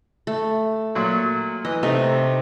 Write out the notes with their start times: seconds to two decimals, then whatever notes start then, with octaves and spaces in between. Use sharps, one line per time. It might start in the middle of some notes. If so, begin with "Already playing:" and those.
0.27 A3
0.95 A#2 F#3
1.65 E3 D#5
1.83 C3 A3 D#4